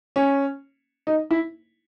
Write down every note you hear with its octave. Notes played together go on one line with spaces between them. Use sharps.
C#4
D#4
E4